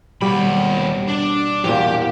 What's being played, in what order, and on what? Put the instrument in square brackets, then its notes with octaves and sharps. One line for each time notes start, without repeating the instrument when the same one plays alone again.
[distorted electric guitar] D#2 B5 [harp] B2 G3 G4
[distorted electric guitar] D4
[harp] E1 A#2 A#3 [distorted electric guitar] G4